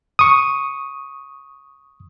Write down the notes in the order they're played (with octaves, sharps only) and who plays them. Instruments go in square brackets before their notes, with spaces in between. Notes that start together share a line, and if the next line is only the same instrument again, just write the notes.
[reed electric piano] C#6 D#6